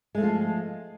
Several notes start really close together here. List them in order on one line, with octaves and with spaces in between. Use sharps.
G#3 A3 F3 F4